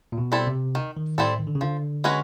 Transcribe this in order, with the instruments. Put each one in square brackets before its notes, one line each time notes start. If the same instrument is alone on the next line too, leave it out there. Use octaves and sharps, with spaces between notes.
[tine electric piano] A#2
B2
[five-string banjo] G3 C4 E4 A4
[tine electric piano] C3
[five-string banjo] D#3
[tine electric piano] D#3
[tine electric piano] A2 [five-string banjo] G3 C4 E4 A4
[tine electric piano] D#3
D3
C#3
[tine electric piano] D3 [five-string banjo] F3
[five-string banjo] G#3 C#4 F#4 B4